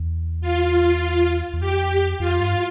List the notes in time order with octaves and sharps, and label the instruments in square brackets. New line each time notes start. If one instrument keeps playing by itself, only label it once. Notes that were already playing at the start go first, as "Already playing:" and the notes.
Already playing: [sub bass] E2
[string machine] F4
[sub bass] E2
[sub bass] F2 [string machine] G4
[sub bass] F2 [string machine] F4
[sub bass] G2